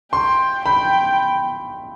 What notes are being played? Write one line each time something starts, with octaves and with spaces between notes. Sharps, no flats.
G5 C6
G5 B5